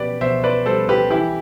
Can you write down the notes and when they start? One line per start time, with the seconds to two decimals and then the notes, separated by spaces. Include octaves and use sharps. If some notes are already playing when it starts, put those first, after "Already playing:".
Already playing: B2 G4 B4 D5
0.21 B2 C5 E5
0.44 B4 D5
0.66 G3 A4 C5
0.89 G4 B4
1.10 E3 E4 G4